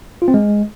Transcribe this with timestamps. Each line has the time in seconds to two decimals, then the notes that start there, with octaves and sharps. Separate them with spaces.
0.22 F4
0.28 C4
0.34 G#3